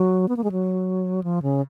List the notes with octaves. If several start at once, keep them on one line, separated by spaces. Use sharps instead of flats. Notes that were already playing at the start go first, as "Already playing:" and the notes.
Already playing: F#3
B3
A#3
G#3
F#3
F3
C#3